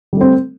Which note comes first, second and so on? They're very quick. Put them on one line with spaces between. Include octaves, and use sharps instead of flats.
G3 A3 C4